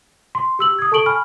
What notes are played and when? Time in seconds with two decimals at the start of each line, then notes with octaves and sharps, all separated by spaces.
0.35 C6
0.59 G4 E6 F#7
0.79 D#6 G#6
0.92 A4 A5 C#6 D7 F#7 G7
1.06 G#5 B5 F6